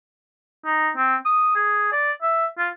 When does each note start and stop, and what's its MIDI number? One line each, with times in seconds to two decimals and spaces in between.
0.65 0.89 63
0.97 1.16 60
1.25 1.51 87
1.55 1.91 68
1.92 2.12 74
2.22 2.46 76
2.58 2.69 65